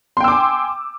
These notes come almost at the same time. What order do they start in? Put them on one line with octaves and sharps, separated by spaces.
C6 G5 E6 D6 G#5